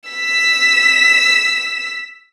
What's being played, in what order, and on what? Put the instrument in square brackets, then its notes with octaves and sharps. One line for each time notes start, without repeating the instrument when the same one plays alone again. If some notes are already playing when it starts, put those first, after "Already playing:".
[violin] E6 B6